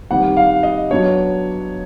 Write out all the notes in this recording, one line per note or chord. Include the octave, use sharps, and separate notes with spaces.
D#3 G3 C4 F#5
F5
D#5
F#3 B3 D4 C#5